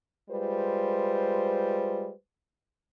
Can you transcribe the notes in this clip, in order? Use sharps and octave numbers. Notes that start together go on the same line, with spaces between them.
G3 G#3 F4 B4 C5